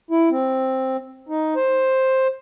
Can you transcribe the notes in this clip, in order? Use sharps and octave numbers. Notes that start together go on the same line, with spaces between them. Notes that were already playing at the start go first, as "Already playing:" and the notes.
E4
C4
D#4
C5